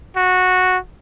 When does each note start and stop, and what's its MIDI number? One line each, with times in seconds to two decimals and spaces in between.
0.17 0.78 66